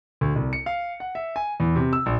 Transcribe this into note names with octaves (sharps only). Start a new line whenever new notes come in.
D2
C2
C#7
F5
F#5
E5
G#5
E2
C3
E6
A#1